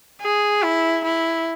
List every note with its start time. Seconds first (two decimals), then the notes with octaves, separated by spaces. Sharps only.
0.22 G#4
0.62 E4
1.04 E4